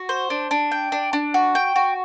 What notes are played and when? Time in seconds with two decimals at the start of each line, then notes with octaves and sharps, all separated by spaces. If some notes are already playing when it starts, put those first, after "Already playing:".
Already playing: F#4
0.09 C5
0.30 D4
0.51 D4
0.72 G5
0.92 D4
1.13 D4
1.34 F#4
1.55 G5
1.76 F#4